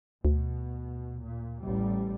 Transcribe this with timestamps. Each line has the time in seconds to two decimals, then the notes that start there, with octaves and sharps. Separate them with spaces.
0.25 D2 B2
1.21 A#2
1.63 A1 G3